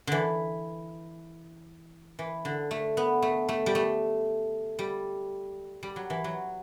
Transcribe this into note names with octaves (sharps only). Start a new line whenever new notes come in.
D3 E3
E3
D3
A3
B3
A3
A3
G3
A3
G3
G3
F#3
E3
F#3